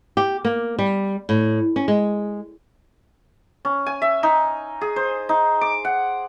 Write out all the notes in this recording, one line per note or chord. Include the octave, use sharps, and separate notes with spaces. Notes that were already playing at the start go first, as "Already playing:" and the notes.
G4
A#3
G3
A2
C#4
G#3
C#4
G#5
E5
D#4
G#4
C5
D#4
D6
F#5